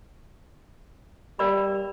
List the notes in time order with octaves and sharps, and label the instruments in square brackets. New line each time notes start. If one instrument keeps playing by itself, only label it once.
[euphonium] G3 [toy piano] A#4 D5 B5